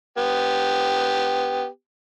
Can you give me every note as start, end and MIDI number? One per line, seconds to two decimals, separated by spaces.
0.18 1.67 59
0.18 1.67 67